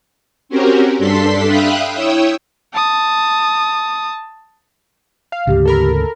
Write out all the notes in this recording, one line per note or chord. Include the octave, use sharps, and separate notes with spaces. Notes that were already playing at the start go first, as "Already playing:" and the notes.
C4 C#4 F#4 G4 A#4
G2 D4 A4 C6 B6
E5 F5 G5 B5 D#6 F#6
E4 C#5 G5 D#6 E6
A5 D#6
F5
D2 G#2 C#3 G4
A4 A#4 B5